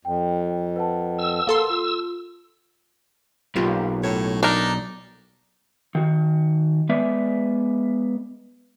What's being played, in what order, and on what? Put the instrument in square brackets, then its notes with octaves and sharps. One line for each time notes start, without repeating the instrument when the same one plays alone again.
[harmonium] F2 [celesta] G5
[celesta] B4 F#5 A5
[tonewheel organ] E6
[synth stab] A#3 A4 C6
[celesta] F4
[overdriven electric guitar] B1 [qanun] A#3 F4 G4
[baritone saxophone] A2 [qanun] C#5
[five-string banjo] D4 A#4 [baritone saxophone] D#4
[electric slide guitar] D#3 F#4
G#3 B3 B4 D5 E5